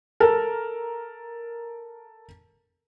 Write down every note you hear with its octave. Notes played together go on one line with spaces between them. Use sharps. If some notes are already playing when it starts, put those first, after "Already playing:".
A4 A#4